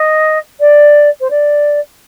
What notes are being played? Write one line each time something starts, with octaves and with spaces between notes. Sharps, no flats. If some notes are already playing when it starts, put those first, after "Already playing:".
Already playing: D#5
D5
C5
D5